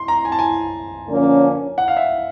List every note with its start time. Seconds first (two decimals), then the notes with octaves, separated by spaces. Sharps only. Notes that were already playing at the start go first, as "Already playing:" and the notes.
Already playing: C6
0.08 A#5
0.25 G#5
0.32 A5
0.39 G#5
1.07 D3 F3 A#3 C#4
1.78 F#5
1.88 F5
1.97 E5